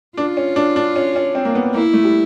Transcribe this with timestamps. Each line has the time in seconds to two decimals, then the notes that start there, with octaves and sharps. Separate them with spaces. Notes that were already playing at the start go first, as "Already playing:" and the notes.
0.17 D4 F4
0.37 C#4
0.56 D4
0.76 D4
0.96 C#4
1.16 C#4
1.35 C4
1.45 A#3
1.55 B3
1.74 A#3 E4
1.93 A3
2.04 G3